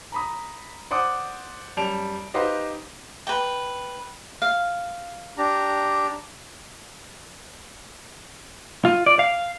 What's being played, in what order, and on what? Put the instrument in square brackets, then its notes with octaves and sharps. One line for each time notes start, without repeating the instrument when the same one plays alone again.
[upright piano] A#5 B5 D#6
C5 D5 F#5 D6 D#6
F#2 G3 A5 D7 F7
D#4 G4 B4 C5 D#5 F5
[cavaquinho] B4 G5
F5
[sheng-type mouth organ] D4 G4 A#5
[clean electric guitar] F4
D5
F5